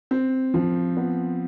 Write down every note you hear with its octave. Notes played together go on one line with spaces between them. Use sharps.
C4
F3
B3